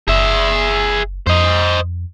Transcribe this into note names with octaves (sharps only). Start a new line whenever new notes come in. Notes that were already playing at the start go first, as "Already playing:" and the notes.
F#1 G#4 E5
F2 C5 D#5